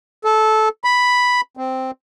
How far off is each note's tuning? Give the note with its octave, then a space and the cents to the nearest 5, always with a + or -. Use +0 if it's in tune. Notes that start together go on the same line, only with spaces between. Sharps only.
A4 -15
B5 +0
C4 -5